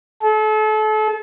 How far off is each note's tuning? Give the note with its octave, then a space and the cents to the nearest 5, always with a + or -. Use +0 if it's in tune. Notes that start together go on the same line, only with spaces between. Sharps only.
A4 -35